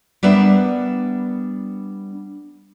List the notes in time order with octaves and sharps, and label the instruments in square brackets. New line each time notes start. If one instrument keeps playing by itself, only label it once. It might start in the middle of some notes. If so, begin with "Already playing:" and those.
[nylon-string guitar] G3 B3 D4 A#4 B4 E5